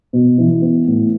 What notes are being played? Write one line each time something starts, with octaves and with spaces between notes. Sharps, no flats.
B2
E3
B3
A2